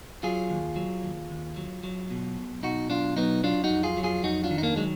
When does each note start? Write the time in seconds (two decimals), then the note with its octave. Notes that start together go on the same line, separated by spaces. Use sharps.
0.23 F#3 F4 G#4
0.50 D#2
0.76 F#3
1.03 D#2
1.30 D#2
1.56 F#3
1.83 F#3
2.11 B2
2.37 B1
2.63 B2 D#4 F#4
2.90 B1 D4 F4
3.17 F#3 B3 D#4
3.43 F#3 D4 F4
3.64 D#4 F#4
3.70 F2
3.83 F4 G#4
3.97 F#3
4.03 F4 G#4
4.23 F2 D#4 F#4
4.44 D4 F4
4.51 D#3
4.58 D#4
4.63 A#3 D4
4.76 F#3 G#3